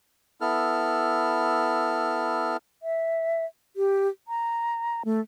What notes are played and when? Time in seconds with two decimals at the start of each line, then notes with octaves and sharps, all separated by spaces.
0.41 B3 E4 A4 F6
2.83 E5
3.76 G4
4.28 A#5
5.05 A3